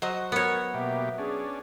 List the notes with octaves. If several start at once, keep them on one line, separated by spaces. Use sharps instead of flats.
F#3 F#4 C5 D#5
B3 A#4 C#5
B2 A#3 G4 E5
C#4 D4 G#4